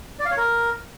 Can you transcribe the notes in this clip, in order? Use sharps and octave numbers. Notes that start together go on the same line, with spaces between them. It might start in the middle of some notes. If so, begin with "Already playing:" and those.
D5
F5
C#5
A#4